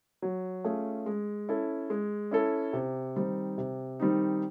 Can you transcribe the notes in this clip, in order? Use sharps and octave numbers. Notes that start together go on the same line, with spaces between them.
F#3
A3 C#4 F4 G#4
G#3
C#4 E4 A4
G#3
C#4 E4 A4
C3
D#3 G3 C4 D#4
C3
D#3 G3 C4 D#4